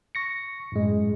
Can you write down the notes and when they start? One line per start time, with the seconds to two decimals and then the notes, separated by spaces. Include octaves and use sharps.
0.15 C#6 A#6 C#7
0.72 F#2 A2 G#3